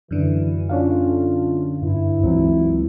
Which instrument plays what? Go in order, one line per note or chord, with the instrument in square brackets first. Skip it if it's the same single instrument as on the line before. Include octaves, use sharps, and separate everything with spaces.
[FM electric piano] F#2 D3 [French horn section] E3
[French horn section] A3 F4 [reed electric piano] C#4 D4 F5
[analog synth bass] G2 [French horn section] E4
[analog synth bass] C#2 [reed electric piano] E3 F#3 C4